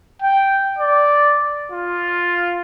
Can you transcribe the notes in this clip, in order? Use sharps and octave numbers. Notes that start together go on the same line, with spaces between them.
G5
D5
F4